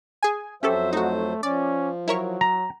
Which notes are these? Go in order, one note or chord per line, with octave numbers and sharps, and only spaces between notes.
G#4 G#5
F2 F#3 C#4 G4 A4 C5 E5
A3 D#4 F#4
F3 C#4 D5
F#3 E4 A#4 C#5
A#5